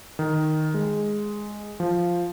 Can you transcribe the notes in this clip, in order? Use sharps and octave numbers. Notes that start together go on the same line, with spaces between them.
D#3
G#3
F3